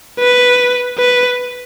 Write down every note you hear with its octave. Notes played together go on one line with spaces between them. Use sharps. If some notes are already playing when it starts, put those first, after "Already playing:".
B4
B4